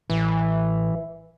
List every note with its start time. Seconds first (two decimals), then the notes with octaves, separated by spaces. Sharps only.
0.10 A1 E3